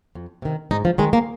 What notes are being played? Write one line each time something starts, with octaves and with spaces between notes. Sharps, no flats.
F2
C3 D#3
G#2 D#4
F3
D#3 G#3
A#3